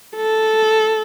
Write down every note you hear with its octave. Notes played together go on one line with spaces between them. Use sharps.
A4